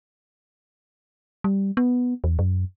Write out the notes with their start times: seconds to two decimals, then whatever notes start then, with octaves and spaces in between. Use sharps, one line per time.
1.44 G3
1.77 B3
2.24 E2
2.39 F#2